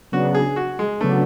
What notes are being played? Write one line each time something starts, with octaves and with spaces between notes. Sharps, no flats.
C#3 F#3 B3 D4 F#4
G#4
F#4
G#3
C#3 F#3 A3 B3 D4